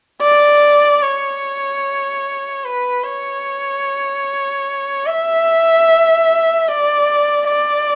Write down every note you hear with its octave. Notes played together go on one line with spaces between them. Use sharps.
D5
C#5
B4
C#5
E5
D5
D5